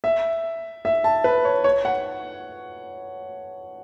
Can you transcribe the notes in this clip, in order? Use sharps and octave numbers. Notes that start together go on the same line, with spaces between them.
E5
E5
A5
B4
C#5
C#5
F#5